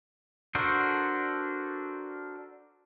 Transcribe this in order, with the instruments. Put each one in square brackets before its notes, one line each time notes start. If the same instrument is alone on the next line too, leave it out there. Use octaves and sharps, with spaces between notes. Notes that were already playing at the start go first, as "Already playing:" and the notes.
[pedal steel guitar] D4 F#4 A4 A#4 C5